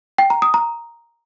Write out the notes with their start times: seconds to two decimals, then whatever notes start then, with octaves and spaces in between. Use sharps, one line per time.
0.18 G5
0.30 A#5
0.42 D#6
0.54 A#5